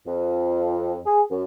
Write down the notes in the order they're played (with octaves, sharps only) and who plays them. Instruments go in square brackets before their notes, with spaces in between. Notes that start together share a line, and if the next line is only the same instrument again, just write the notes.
[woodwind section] F2
G#4
F#2